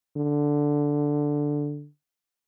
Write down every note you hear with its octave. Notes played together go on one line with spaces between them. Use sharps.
D3